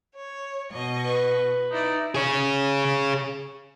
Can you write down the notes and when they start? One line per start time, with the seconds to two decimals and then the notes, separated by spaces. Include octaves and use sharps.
0.15 C#5
0.72 B2 D#5 C#6
1.05 B4
1.71 D#4 E4 D5
2.15 G#4 C#5